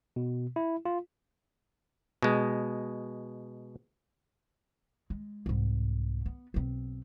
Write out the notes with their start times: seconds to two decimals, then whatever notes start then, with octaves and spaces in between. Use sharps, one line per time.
0.16 B2
0.56 E4
0.85 F4
2.22 B2 G#3
5.10 G#3
5.46 C2 G#2
6.26 B3
6.54 B1 C4